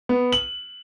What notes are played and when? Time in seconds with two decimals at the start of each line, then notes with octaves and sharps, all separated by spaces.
0.09 B3
0.33 F#7